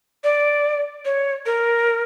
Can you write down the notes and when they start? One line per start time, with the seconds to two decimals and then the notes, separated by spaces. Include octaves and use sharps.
0.24 D5
1.05 C#5
1.46 A#4